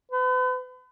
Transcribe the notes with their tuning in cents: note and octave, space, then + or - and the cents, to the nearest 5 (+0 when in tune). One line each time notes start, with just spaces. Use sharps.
B4 +40